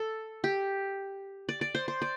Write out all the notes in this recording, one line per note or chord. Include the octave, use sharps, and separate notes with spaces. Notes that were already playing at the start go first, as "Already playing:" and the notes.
Already playing: A4
G4
D5
D5
C5
C5
D5